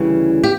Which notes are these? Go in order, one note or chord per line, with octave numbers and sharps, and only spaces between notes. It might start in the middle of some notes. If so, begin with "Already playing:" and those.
Already playing: D2 C#3 E3 G3
G4